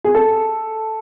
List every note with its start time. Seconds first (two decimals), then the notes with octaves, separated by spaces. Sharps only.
0.04 G#4
0.15 A4